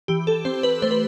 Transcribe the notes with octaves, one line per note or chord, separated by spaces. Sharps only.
E3 G4
A4
C4 C5
B4
A3 C5
B4